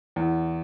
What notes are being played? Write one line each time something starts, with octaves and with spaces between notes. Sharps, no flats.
E2